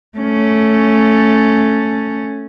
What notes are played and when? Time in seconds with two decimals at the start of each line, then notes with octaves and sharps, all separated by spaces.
0.18 A3 C#4